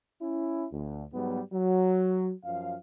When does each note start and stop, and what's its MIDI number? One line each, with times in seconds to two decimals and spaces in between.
0.22 0.67 61
0.22 0.67 64
0.72 1.03 38
1.13 1.41 44
1.13 1.41 54
1.13 1.41 55
1.13 1.41 59
1.53 2.32 54
2.44 2.75 42
2.44 2.75 53
2.44 2.75 77